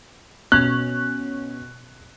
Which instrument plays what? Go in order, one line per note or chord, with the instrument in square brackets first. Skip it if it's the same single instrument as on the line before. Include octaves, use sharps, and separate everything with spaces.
[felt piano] B2 [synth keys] C#4 [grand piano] F#6